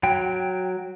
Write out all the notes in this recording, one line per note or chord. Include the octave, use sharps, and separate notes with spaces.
F#3 G5